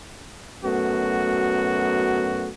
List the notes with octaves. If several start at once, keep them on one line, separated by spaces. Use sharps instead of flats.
F#2 A3 B3 F#4